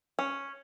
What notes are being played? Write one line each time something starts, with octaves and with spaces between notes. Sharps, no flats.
C#4